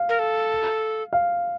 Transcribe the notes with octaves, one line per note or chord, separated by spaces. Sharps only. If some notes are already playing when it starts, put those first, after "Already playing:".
Already playing: F5
A#4
A4
F5